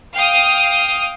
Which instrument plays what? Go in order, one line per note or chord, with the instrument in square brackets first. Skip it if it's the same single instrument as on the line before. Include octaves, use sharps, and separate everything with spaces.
[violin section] F5 G5 D#6